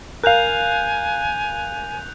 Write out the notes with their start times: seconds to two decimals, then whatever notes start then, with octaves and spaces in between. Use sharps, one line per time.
0.24 A#4 F5 G#5 F#6 G6 F7